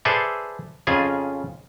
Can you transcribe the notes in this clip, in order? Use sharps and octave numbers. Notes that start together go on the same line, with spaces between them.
G#4 A4 B4 C5 D5 E5
F2 C#3 F4 G#4 G#5